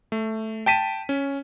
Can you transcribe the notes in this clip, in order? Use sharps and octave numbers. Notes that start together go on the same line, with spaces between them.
A3
G5 A5 B6 D#7
C#4